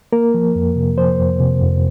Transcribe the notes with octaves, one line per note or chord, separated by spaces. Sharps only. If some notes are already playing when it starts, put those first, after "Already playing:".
A#3 A#4
F3
F2
C3
F3 C5
F2
C3
F2